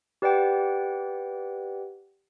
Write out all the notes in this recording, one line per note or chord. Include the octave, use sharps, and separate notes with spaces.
G4 B4 D5 F#5 G5